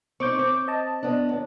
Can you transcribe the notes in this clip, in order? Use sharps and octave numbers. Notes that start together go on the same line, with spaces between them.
C4 D#4 C#6 D6 G6
C4
D#5 A5
B3 D4
D#2